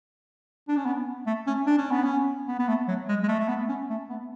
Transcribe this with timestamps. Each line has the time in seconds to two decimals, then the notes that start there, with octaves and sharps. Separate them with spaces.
0.68 D4
0.77 C#4
0.86 B3
1.26 A3
1.47 C#4
1.66 D4
1.78 C#4
1.91 B3
2.04 C#4
2.48 B3
2.59 B3
2.68 A3
2.88 F#3
3.08 G#3
3.23 G#3
3.28 A3
3.39 A3
3.48 B3
3.68 C#4
3.90 A3
4.09 B3